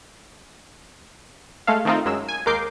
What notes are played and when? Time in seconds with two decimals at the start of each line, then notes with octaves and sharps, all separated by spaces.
1.67 G#3 A3 A4 F5
1.85 D#3 A3 C4 D#4 F4
2.05 F#2 F#3 G#3 E6
2.28 G#5
2.46 D#2 G#3 A#4 D6 G6 C7